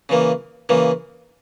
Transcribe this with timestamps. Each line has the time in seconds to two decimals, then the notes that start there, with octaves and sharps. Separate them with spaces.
0.09 C#3 E3 A#3
0.69 C#3 E3 A#3